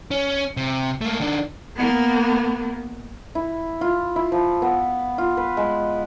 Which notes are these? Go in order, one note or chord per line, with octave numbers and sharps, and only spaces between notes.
C#4
C3
A3 A#3
D#3 D4
A#3 B3
E4
F4
E4
F3
B3
F4
B4
G#3